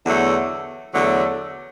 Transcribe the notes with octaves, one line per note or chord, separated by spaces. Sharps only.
E2 D3 F#3 A3
E2 D3 F#3 A3